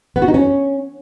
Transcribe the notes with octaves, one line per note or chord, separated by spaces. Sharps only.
B3
F#4
D#4
C#4